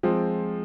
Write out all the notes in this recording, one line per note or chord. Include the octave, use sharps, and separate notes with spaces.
F3 G#3 C4 F4